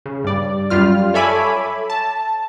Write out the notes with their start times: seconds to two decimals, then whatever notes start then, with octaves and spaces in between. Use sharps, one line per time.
0.06 C#3
0.24 G2 D5
0.70 F#2 G3 F4 F6
1.14 A4 C#5 E5 G#5 B5 D6
1.90 A5